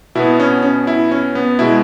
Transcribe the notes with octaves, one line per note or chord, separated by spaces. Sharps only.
B2 B3 E4
C#4
C#4
E4
C#4
B3
B2 G#3 E4